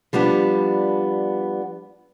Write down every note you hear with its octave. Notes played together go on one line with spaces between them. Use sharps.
F3 G3 B3 D4